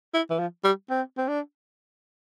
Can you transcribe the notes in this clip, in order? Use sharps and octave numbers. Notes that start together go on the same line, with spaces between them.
E4
E3
F3
G3
C4
C4
D4